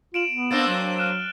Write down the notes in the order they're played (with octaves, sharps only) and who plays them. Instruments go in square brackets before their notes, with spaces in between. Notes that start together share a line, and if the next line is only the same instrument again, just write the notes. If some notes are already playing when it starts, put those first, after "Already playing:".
[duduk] F4 [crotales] D7 E7 F#7
[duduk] B3
[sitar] A#3 C4 D4 [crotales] A6 G7
[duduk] F#3
[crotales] F6 F#6 E7